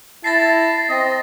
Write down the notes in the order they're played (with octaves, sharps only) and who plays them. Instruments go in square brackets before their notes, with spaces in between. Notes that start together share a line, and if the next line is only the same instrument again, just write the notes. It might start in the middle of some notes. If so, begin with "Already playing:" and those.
[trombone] E4 [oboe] A5 [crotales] A6 A#6 C7
[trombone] C4 [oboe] D#5